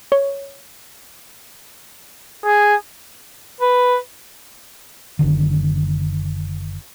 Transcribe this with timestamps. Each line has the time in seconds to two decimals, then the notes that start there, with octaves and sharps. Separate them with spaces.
0.12 C#5
2.45 G#4
3.61 B4
5.19 F#1 D3 D#3